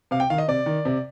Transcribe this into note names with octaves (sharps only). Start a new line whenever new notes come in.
C3 F5
G5
D#3 F5
D#5
C3 D5
D#3
C3